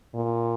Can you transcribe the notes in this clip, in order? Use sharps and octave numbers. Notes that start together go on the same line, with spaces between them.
A#2